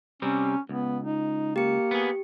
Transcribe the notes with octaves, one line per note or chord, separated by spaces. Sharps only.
C3 G3 C4 C#4
C#2 B3
D#4
A#3 G4 C#7
B3 G#4